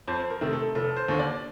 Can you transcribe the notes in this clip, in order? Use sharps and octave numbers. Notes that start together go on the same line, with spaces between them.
F2 C5
A#4
C3 D#3 A3 C4
A4
F1 A4
C5
D#2 D3
D5